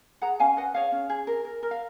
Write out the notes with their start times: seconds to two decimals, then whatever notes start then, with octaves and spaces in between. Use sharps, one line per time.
0.22 G#4 F#5 A#5
0.40 C#4 F5 G#5
0.57 B4 D#5 F#5
0.74 G#4 C#5 F5
0.92 C#4
1.09 G#4
1.27 A#4
1.45 A#4
1.63 A#4
1.71 F5